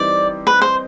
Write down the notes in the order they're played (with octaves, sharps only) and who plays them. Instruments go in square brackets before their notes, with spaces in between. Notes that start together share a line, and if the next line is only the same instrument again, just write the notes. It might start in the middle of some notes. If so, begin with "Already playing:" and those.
Already playing: [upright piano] E3 G3 C4 D#4 [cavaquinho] D5
[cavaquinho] B4
C5